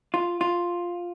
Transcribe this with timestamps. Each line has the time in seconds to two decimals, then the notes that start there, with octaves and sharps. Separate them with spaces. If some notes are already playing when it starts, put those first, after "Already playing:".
0.14 F4
0.41 F4